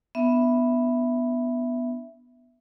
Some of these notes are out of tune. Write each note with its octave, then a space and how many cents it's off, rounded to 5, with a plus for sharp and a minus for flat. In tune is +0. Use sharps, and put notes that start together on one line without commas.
B3 +0 D4 +10 E5 +0